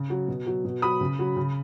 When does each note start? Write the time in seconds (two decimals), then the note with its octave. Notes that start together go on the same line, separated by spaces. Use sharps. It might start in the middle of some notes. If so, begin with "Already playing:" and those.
Already playing: C#3
0.10 F#3
0.28 B2
0.47 F#3
0.65 B2
0.82 F#3 B5 D#6
1.01 C#3
1.19 F#3
1.36 C#3